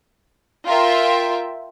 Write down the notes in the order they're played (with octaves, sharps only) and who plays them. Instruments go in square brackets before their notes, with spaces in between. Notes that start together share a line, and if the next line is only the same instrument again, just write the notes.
[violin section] F4 A#4 E5 G5